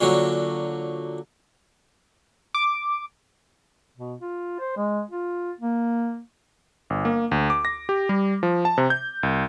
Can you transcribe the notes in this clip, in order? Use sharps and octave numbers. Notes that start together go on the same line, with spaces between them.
A#2 D3 F#3
D6
B2
F4
C5
G#3
F4
A#3
G1
A#3
D2
D6
A#6
G4
G3
F3
A5
C3
G6
C2